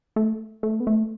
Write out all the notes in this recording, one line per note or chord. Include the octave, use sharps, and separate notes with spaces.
A3
A3
B3
A3